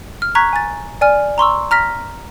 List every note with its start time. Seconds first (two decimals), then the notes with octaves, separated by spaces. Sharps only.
0.22 F6
0.35 A#5 C#6 F#6 G#6 B6
0.53 G#5 A6
1.01 D5 G#5 F6
1.38 A#5 C6 C#6 E6
1.71 A#5 F6 A#6 B6